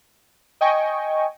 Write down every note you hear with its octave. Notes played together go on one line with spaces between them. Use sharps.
D#5 G5 G#5 C#6